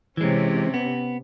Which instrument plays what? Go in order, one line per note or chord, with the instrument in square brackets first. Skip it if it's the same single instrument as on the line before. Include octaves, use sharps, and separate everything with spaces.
[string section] C3 C#4 [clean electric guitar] E3 G#3
[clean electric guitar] B3